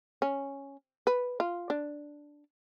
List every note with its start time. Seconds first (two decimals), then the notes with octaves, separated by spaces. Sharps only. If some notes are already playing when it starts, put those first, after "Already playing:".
0.22 C#4
1.07 B4
1.40 F4
1.70 D4